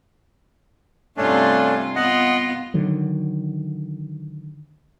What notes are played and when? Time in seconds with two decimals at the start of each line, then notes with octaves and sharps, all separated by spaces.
1.17 G2 C3 A3 C#4 D4 F4
1.96 B3 F4 D#5 F#5
2.74 D3 D#3 F#3